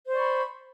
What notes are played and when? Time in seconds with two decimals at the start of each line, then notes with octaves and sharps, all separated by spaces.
0.07 C5
0.11 D5
0.15 C#6
0.18 B5